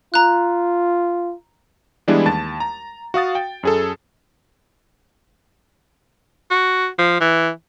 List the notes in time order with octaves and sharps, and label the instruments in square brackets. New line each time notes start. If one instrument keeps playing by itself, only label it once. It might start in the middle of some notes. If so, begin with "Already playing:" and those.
[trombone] F4 [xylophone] A#5 F#6
[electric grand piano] E3 G3 G#3 B3 D4 E4
D#2 A5 A6
A#5
F#4 F5 D#6 A6
G5
F#2 G#4 A4
[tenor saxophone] F#4
F3
E3